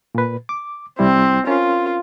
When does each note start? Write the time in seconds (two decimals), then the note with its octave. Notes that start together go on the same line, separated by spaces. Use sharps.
0.15 A#2 B4
0.49 D6
0.99 C2 G3 C4 E4
1.47 C#4 F4 A#4